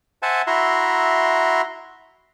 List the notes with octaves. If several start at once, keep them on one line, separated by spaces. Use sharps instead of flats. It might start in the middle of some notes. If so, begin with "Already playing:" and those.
C5 E5 F#5 G#5 A5
E4 F#4 E5 A#5 C6